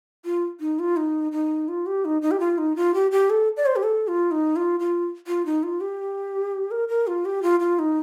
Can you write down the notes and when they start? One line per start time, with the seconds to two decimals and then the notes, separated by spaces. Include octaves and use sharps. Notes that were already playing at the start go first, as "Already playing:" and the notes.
0.25 F4
0.60 D#4
0.79 F4
0.97 D#4
1.32 D#4
1.68 F4
1.86 G4
2.05 D#4
2.22 D#4
2.31 G4
2.40 F4
2.58 D#4
2.76 F4
2.94 G4
3.11 G4
3.30 A4
3.57 D5
3.66 C5
3.76 G4
3.83 A4
4.08 F4
4.31 D#4
4.56 F4
4.80 F4
5.27 F4
5.45 D#4
5.63 F4
5.81 G4
6.71 A#4
6.89 A#4
7.07 F4
7.25 G4
7.43 F4
7.60 F4
7.79 D#4